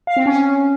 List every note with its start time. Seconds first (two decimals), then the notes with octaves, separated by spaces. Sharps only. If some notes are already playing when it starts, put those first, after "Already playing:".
0.07 F5
0.16 C4
0.26 C#4